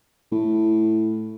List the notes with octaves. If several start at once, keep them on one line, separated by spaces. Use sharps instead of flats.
A2